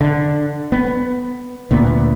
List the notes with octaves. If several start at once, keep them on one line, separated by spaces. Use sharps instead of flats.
D3
B3
D2 A#2 B3